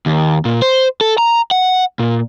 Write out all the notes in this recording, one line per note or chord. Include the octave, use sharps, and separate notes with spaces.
D#2
A#2
C5
A4
A#5
F#5
A#2